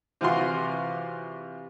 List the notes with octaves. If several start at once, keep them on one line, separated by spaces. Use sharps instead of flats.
C3 E3 G3 F4 F#4 C6